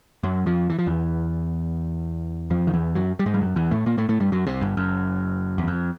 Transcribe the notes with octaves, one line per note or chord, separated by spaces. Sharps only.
F#2 F#3
F2 F3
E3
F3
E2 E3
F2 F3
D#3
E2 E3
F#2 F#3
G3
G#2 G#3
G3
F#2 F#3
E2 E3
A2 A3
A#2 A#3
A2 A3
A2 A3
G2 G3
F#2 F#3
C2 C3
G1 G2
F#1 F#2
E2
F2